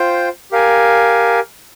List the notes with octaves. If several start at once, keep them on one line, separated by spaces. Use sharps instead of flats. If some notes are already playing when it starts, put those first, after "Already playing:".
Already playing: F4 C5 G5
G4 A#4 F5 G#5